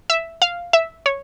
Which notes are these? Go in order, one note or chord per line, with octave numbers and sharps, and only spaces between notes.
E5
F5
E5
C#5